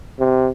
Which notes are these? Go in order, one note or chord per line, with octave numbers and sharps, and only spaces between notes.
C3